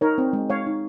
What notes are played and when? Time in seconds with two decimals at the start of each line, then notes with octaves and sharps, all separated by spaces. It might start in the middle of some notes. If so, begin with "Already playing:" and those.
0.01 D#4 A#4 C#5
0.18 C4
0.33 G#3
0.50 G#3 C#5 F5
0.67 D#4